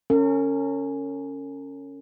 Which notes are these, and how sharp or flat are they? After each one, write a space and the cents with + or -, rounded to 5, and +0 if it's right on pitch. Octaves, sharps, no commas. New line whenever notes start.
C#4 +0 A#4 -40